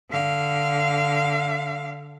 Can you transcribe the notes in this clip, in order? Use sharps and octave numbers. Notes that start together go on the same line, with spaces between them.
D3 F5